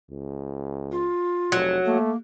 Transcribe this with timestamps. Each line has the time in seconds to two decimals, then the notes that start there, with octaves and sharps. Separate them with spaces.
0.11 C#2
0.92 F4
1.52 F1 F#3
1.85 A3 A#3